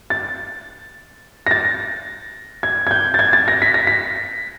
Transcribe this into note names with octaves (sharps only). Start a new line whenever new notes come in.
A6
A#6
A6
G#6
G#6
G6
A6
G#6
A6
A#6
B6
A#6
B6